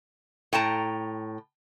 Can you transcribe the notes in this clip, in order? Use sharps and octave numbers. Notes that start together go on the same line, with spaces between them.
A2 G5 A5 A#5